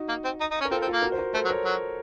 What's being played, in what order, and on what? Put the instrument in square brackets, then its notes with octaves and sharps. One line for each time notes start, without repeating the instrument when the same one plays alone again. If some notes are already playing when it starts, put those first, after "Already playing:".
Already playing: [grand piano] D#4 F#4
[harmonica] A#3
C4
D#4
D#4
C#4
[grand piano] A#4
[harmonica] C4 [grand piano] F4 A4
[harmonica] C4
[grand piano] F4 A4
[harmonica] A#3
[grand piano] F#4 A#4
C5
F#4 A#4
[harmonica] A3 [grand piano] A4 C5
[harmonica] F#3
[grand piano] A#4 C#5
[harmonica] F#3